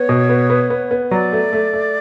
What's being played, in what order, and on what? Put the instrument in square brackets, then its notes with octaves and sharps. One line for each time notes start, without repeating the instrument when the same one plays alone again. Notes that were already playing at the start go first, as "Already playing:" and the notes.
Already playing: [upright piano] B3 [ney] C#5
[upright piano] B2
B3
B3
B3
B3
[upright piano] F#3 [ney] D5
[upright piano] A3
A3
A3